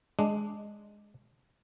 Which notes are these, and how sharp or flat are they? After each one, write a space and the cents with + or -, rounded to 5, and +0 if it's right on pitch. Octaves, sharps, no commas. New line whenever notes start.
G#3 +0 D4 +0